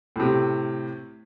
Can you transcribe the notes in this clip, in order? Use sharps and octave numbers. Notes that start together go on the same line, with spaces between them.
A2 C3